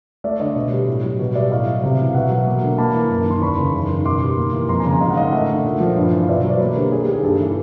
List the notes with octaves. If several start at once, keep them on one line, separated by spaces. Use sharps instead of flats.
A3 D5 E5
D3 C#5 D#5
B2
G3
A2
F#3
B2
G3 D5 E5
A2 D#5 F5
F#3
C3
E3
F5
B2 E5 F#5
F#3
A#3
D3
A#3 A5 B5
E3
F#2
D#3 C6
E2 B5 C#6
C#3
F#2
D#3
B2 C6 D6
G3
A#3
E3
F2 A#5 C6
G#5 A#5
C#3
G#5 A#5
G#2 D#5 F5
F#5
D#3 D#5 F5
A3 E5 F#5
D3
A#2
F3
G2
E3
F5
B2 D5 E5
F#3
C5 D5
A#3 B4 C#5
D3 G4
A#3 G#4
G4
D#3
G#4
G2 G4 A4
E3